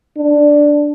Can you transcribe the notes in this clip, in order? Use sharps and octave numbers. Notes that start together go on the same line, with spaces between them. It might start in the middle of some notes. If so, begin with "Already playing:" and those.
D4